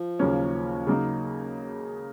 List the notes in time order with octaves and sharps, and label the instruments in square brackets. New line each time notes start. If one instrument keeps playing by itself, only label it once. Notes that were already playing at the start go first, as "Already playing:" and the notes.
Already playing: [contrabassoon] F3
[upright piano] D#2 C#3 F#3 A#3 C#4
C#3 F#3 A#3 D#4